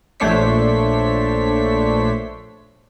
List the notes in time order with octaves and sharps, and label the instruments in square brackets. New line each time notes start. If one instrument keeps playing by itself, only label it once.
[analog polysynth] A#1 A3 D4 C5 C#5 B6